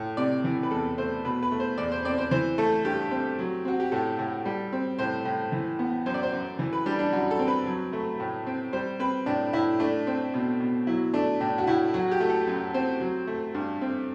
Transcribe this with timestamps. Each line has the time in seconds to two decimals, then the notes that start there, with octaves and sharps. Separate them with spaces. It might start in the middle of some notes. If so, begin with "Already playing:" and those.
Already playing: A2
0.17 C3 D5
0.44 E3
0.63 B4
0.71 E2 A4
0.98 A3 C5
1.24 B2 B4
1.42 B4
1.52 A3
1.60 C5
1.78 E2 D5
1.92 C5
2.05 C4 D5
2.18 C5
2.31 E3 C5
2.58 A3 A4
2.85 G2 G4
3.11 C4
3.39 F#3
3.65 C4 F#4
3.80 G4
3.92 A2 A4
4.19 A2
4.45 G3
4.72 C4
4.99 A2 C5
5.25 A2
5.52 E3
5.79 B3
6.06 F#2 C5
6.14 D5
6.23 C5
6.32 F#2
6.59 E3
6.73 B4
6.86 G3 D4
6.99 D4
7.13 F#2 F#4
7.31 A4
7.39 C4
7.48 B4
7.66 F#3
7.93 A3
8.20 A2
8.46 C4
8.73 G3 C5
8.99 C4 B4
9.26 A2 D4
9.53 A2 E4
9.80 A3 D4
10.07 C4
10.34 B2
10.60 B2
10.87 F#3 E4
11.14 A3 D4
11.40 A2 D4
11.58 F#4
11.67 A2 E4
11.94 F#3 F#4
12.11 G4
12.20 A3
12.30 A4
12.47 F#2
12.74 C4 C5
13.00 F#3
13.27 A3
13.54 G2
13.81 C4